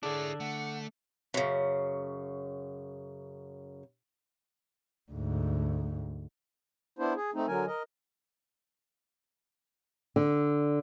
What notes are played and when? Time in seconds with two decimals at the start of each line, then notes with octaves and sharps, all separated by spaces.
0.03 D3 D4 E4 G#4 C#5
0.40 A3 F#5
1.34 F#2 C#3
5.11 D2 G#2
6.99 B3 D4 E4 C5
7.16 G#4
7.34 A3 C4 D#4
7.48 D3 F#3 A#4 G#5
7.67 A#4 D#5
10.16 D3